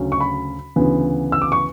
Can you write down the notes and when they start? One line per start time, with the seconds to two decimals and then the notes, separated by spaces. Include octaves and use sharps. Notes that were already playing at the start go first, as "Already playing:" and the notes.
Already playing: D2 C#3 F#3 C#4
0.12 C#6
0.20 B5
0.76 D2 C#3 E3 B3
1.32 E6
1.42 D6
1.52 C#6